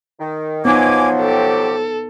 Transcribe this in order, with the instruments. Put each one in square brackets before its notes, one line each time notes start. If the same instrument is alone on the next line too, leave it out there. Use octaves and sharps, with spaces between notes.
[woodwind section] D#3
[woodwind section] F3 F#3 [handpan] B3 D#4 [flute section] G#5 D6 G#6
[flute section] G4 [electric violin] A4